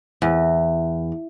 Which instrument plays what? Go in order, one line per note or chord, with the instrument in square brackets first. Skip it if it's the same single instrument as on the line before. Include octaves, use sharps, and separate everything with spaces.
[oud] E2